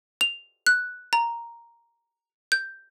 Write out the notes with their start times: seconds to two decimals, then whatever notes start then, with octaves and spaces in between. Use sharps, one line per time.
0.21 F7
0.67 F#6
1.13 A#5
2.52 G6